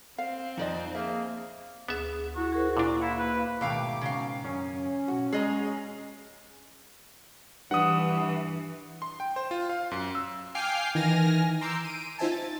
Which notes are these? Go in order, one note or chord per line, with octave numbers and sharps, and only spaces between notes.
C4 F5
F2 D#4 D5 D#5
A#3 G#4 E5
D2 B3 G#4 E5
E4 F#4
G#4 A#4 C5
A#2 D4 E4
A#3 E4 F5
B4
G#2 B2 D#3 A3 F5 G5 D6
C#3 F5
F#2 C#4
B1 F#4
G#3 G#4 D#5 A#5
G2 E3 F#5 D#6
C6
G5
C5
F4
F5
F#2
E6
F5 G5 G#5 D6 F6 C7
D#3 E3 G#5 F6 A#6
A#5 C6 D6 E6 G6 C7
D7 D#7
D#4 F4 C5 E5 G#5 A5
A6